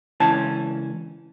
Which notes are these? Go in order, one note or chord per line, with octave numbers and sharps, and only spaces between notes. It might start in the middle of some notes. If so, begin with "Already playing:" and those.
C#2 E3 C#4 A5